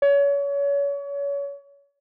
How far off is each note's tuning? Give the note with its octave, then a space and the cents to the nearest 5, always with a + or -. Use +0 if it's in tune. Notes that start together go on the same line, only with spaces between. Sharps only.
C#5 +30